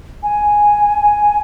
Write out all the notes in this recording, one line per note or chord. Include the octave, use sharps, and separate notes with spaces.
G#5